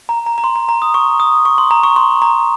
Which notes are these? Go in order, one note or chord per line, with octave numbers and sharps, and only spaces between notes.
A#5
A#5
A#5
C6
A#5
A#5
D#6
C#6
D#6
C#6
C6
A#5
C#6
C6
A#5